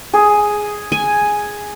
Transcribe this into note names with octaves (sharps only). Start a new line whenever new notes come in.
G#4
G#5